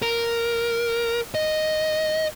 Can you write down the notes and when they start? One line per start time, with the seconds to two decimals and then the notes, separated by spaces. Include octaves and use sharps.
0.02 A#4
1.35 D#5